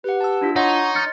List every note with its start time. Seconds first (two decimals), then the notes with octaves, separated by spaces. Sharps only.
0.04 G4 B4 F#5
0.21 A5 E6
0.41 D4 E4 F4
0.56 D#4 C#5 D#5 F#5 C6 C#6
0.95 F6 A6 C#7